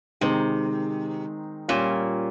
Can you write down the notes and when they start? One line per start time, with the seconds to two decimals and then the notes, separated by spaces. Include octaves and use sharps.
0.21 C3 D#3 G#3 C4 D#4
1.68 A#2 G3 C#4 F4